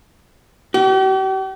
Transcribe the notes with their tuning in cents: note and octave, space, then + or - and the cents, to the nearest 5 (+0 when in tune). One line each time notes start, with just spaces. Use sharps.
G4 -45